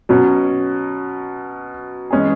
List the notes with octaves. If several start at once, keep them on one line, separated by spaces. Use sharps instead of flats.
B2 F#3 C#4
E3 G#3 C#4 G#4